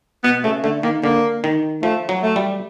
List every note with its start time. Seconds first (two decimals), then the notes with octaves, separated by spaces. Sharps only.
0.24 B2 B3
0.44 C#3 A3
0.63 D3 A3
0.83 D#3 A#3
1.04 D3 A#3
1.44 D#3
1.83 F3 A3
2.09 F#3
2.23 A3
2.36 G3